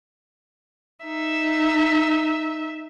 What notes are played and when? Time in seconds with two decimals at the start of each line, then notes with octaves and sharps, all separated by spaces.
1.05 D#4 E5